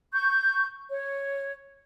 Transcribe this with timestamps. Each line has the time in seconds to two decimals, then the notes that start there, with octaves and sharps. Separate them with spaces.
0.13 C#6 G6
0.90 C#5